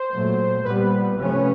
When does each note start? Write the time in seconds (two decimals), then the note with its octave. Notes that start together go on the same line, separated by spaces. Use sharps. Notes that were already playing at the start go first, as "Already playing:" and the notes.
Already playing: C5
0.11 A#2 F#3 A3
0.64 A#2 G3 B3 B4
1.17 C3 F3 A3 C#4